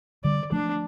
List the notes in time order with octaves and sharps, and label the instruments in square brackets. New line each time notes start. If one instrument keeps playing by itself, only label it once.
[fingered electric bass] D3 G3 [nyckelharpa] D5
[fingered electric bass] F3 A3 [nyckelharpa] D4